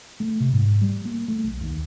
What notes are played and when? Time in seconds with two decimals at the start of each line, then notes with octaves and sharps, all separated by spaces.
0.20 A3
0.40 C3
0.53 G#2
0.81 G3
1.05 A#3
1.28 A3
1.44 B1
1.61 D#2